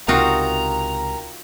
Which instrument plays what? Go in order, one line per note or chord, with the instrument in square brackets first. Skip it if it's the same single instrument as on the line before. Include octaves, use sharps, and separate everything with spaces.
[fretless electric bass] C#2 C3 [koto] D#4 F4 F#4 [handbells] A#4 G5 [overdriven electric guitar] A#5